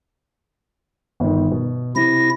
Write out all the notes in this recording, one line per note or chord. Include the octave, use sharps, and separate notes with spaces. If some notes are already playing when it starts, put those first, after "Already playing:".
G1 D#3
B2
C3 E4 A#6